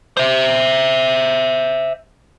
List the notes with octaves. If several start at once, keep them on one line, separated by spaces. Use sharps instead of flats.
C5 E5